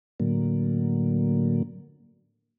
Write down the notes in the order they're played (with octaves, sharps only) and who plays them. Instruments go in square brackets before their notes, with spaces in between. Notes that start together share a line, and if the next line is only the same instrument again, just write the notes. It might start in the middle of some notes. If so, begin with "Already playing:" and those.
[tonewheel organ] A2 D3 F#3 A#3